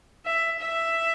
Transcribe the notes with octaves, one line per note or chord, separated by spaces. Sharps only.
E5
E5